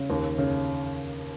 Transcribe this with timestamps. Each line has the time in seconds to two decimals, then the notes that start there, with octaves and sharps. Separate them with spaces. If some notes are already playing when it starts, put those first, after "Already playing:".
Already playing: C#3
0.10 D#2
0.38 C#3